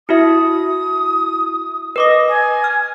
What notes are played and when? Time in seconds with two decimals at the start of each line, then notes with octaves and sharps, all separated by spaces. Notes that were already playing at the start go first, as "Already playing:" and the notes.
0.09 E4 F#4 E5 D#6
1.96 B4 D#5 D6 D#6
2.29 G#5
2.64 F6